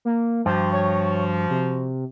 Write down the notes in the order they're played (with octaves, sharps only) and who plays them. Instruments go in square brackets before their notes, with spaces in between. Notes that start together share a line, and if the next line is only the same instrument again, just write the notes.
[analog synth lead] A#3
[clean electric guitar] G2 [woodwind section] F3 F#4 [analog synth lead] C5
[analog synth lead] C#5
C3